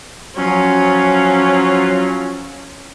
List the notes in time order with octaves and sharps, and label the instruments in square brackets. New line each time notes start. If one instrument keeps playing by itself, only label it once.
[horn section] F3 F#3 F4 [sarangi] C#4